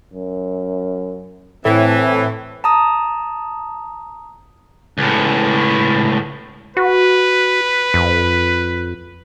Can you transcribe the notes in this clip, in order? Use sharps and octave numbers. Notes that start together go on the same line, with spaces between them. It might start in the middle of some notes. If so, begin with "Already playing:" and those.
F#2
A2 E3 C4
A5 A#5 D#6
C#2 A2
F#4 B4
F2